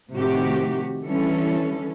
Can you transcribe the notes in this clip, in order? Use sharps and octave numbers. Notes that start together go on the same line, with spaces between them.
A2 C3 D#3 F3 F#4 G4
D3 E3 G3 C#4 A4